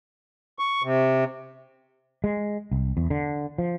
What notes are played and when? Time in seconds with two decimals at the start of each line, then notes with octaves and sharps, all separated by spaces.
0.59 C#6
0.83 C3
2.24 G#3
2.71 C2
2.97 E2
3.10 D3
3.58 F3